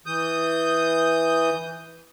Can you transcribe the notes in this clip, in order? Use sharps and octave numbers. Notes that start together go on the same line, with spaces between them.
E3 D#6 G6